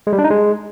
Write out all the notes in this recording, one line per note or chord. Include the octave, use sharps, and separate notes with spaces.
G#3
G3
D4
D#4
G#3